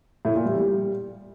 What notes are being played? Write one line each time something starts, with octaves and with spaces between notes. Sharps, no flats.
A2
A#2
G3
G3